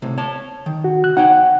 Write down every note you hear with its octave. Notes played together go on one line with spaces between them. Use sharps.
A2 C3
C#5 A5
D#3
F#4
F#6
D#4 C#5 F#5 G5